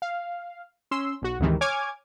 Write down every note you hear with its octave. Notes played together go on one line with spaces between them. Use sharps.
F5
C#4 C6 E6
B1 F#4
D2 G#2 C3 D#3 E3
C#5 G#5 D6 F6 G#6